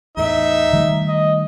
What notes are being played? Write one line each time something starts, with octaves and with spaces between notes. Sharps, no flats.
E2 A2 D#4 E5
D#3 G3 A3
D#5